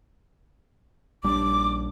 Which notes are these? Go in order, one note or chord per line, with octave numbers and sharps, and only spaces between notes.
A#1 G3 D4 D6